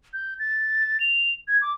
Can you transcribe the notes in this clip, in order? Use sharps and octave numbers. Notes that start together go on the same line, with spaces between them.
G6
A6
F7
G#6
D6